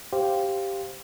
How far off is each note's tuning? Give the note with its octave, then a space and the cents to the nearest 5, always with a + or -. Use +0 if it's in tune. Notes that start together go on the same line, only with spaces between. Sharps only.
G4 +0 C5 +0 F5 -5